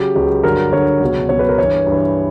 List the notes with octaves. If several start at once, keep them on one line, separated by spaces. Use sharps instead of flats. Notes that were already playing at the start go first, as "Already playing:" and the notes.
Already playing: C#3 F#3 G4
C#2 C#3 F#3
G2 D3 F#3 A#4
G2 D3 F#3 C#5
C#2 B2 F#3
C#2 B2 F#3 C#5
B4
A#4
G2 E3 C#5
G2
E3